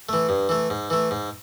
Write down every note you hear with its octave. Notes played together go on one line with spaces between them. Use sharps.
E3 A3
G2
E3 A3
G#2
E3 A3
G#2